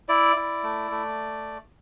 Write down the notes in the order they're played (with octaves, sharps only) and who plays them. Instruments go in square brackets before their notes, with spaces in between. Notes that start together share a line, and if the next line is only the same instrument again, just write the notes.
[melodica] E4 D5
E4
A3
A3